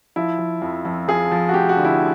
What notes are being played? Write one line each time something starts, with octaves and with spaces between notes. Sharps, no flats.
F3 E4
F3
F2
F2
F3 G#4
F3
F#4
F1 G4
F#4
D3
E4